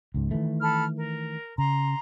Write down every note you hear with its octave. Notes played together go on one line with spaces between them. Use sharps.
C#2 G#2
D#3 E3 A3
A4 B5 F6
A#4
C#3 A#5 C6